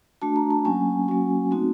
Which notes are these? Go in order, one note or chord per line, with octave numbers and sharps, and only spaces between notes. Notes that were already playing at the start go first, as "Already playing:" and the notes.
A3 D4 F#4 A5
A#5
A5
F#3 A#3 C#4 G#5
F#3 A#3 C#4 F#4
A3 C4 D#4 F#4